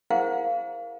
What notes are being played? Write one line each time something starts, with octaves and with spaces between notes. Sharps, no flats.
E4 G#4 A#4 C5 F5 F#5